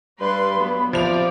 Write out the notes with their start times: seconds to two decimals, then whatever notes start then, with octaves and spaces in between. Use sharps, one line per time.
0.21 G2 G3 B4 B5 C6
0.57 F#3 B3
0.93 C3 F3 D5 F7